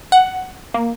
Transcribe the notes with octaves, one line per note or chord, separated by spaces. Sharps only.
F#5
A#3